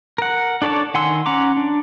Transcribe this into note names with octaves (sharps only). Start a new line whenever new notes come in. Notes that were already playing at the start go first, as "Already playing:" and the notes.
A#4 F#5
D4 A4 C#5 D5 A5
D#3 F#5 G#5 C6 E6
C#4 F#5 A#5 D6
D4